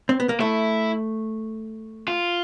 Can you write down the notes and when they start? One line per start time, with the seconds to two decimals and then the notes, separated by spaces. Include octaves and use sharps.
0.09 C4
0.20 B3
0.29 A#3
0.40 A3 E4
2.08 F4